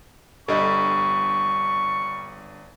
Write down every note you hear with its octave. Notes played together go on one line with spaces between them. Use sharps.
G1 G3 D4 A4 D#5 C#6